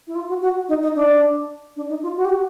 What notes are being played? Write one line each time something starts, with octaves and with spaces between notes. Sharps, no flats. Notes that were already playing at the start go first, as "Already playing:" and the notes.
E4
F4
F#4
F#4
D#4
D#4
D4
D4
D#4
F4
F#4
G4
F#4